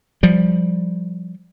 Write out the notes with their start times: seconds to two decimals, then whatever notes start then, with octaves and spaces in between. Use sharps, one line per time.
0.23 F3 G3